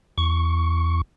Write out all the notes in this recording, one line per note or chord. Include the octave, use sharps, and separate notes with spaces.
E2 C#6